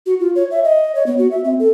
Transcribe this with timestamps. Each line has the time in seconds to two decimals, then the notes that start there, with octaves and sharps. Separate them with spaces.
0.06 F#4
0.20 F4
0.35 C#5
0.51 E5
0.64 D#5
0.95 C#5
1.06 B3
1.18 F#4
1.31 E5
1.44 C4
1.59 A4